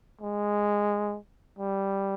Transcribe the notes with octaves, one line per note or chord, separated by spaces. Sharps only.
G#3
G3